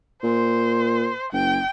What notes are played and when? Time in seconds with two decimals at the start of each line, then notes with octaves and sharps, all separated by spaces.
0.23 A#2 C5
1.33 F#1 G5